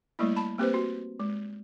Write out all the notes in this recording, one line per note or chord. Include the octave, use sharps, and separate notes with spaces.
G3 A3 A#3 E4
A5 B5
A#3 C4 G4 B4 C5
F#4
G#3